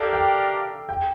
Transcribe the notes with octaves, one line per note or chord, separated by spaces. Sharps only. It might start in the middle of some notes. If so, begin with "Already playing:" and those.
Already playing: D4 G4 A4 A#4 D5 F5
G5
G5